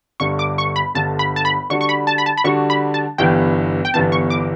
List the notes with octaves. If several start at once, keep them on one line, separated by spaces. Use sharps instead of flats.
G1 G2 D3 C#6
D6
C#6
B5
G1 G2 D3 A5
B5
A5
B5
D3 G3 D4 F#4 C#6
C#6
B5
A5
B5
A5
B5
D3 G3 D4 F#4 C#6
B5
A5
G1 G2 E3 B3 G5
G5
G1 G2 E3 B3 A5
C#6
D6